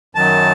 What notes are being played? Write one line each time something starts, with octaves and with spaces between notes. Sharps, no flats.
F#2 D#3 F#3 A5